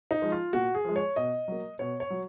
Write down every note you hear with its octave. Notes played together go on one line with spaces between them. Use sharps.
D#4
F3 G#3
F4
A#2 F#4
G#4
F3 G#3
C#5
B2 D#5
F#3 A#3
B2 C#5
C#5
F#3